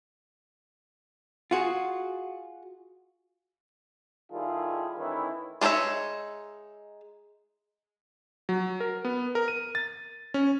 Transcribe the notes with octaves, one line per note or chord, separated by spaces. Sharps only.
F4 F#4 G#4
D#3 G3 E4 F4 G#4 A4
D#3 E3 A3 C#4 E4
G#3 D4 D#4 C#5 E5
F#3
A#4
B3
A#4
D#7
A6
C#4